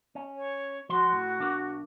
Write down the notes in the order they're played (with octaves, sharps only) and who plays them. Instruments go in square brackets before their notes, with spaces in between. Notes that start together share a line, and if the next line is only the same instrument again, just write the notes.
[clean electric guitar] C#4
[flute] C#5
[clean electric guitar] F3 C6 [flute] F#4
[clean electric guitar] A2
B1 D4 A#4